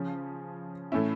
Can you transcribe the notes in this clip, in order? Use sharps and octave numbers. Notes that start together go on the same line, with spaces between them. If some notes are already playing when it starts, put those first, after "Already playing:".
Already playing: C#3 F3 C#4
A2 E3 A3 C#4 E4